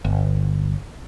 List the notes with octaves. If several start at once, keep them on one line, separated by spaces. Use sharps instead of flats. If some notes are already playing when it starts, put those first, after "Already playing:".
G1